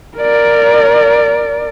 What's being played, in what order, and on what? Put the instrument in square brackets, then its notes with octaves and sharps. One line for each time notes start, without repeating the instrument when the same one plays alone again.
[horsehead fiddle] A#4 D5